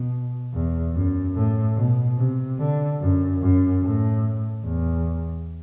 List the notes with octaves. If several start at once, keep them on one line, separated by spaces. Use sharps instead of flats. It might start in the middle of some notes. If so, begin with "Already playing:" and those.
Already playing: B2
E2
F#2
A2
B2
C3
D3
F#2
F#2
A2
E2